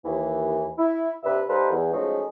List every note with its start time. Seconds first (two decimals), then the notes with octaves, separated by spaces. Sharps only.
0.04 D#2 E3
0.79 E4
1.24 G2 C3 D4 B4 E5
1.49 G3 D#4 A4 B4 C5 F5
1.72 E2
1.92 F3 F#3 G#3 A3 C#4 D#4